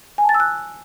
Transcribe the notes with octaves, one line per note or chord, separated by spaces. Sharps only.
G#5
A5
A6
E6
F#6